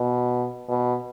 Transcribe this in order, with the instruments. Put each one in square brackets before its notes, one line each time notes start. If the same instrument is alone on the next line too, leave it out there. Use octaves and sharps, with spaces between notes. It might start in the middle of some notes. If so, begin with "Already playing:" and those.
Already playing: [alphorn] B2
B2